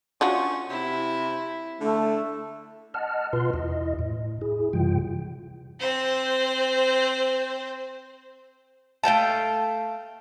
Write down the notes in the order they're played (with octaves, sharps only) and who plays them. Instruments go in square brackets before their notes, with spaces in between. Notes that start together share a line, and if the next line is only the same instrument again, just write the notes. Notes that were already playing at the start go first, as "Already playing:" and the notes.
[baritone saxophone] C#4 [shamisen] D4 F4 F#4
[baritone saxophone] C3 [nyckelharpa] E4
[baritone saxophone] D3 [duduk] A3
[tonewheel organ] D#5 F#5 A5 F6
B2 F4 B4 C6
E2 E4 D#5
A2
E4 G#4
F#2 C3 E3 G3 F4 G5
[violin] C4 C5
[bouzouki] A3 F5 G5 A5